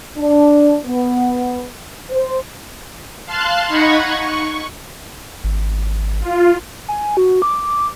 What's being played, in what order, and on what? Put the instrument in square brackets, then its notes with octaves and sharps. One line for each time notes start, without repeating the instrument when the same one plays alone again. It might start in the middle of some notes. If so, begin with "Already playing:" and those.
[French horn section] D4
B3
C5
[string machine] F5 A5 C6 F#6
D#4 D#5 F#5 B5 C#6 G#6
C#6
[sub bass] G#1
[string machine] F4
[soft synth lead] G#5
F#4
D6